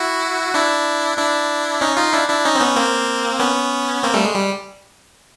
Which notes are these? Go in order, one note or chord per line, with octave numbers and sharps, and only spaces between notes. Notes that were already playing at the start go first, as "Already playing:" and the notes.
Already playing: E4 F#4
D4 E4
D4 E4
C#4 D#4
D#4 F4
D4 E4
D4 E4
C#4 D#4
C4
B3 C#4
A#3 C4
B3 C#4
A#3 C4
G3 A3
G#3
G3